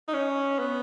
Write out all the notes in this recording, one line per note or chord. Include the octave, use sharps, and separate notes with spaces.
D#4
C#4
B3